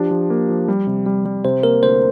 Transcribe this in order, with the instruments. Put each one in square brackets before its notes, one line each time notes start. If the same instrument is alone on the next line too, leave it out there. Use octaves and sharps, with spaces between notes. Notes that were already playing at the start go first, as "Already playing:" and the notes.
Already playing: [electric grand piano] F3 D4 [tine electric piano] G4
[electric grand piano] F3
A#3
F3
G3
C3
G3
G3
[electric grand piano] C3 [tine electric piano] C5
[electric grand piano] A#3 [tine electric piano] A#4
[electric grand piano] D2 [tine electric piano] C5